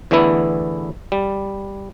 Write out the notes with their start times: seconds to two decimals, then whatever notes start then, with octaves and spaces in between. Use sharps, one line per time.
0.11 E2 D3 E3 A3 B3 E4
1.12 G3